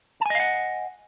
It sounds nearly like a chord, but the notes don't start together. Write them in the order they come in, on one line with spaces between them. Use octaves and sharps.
A5 G#5 D#5 F5 F#5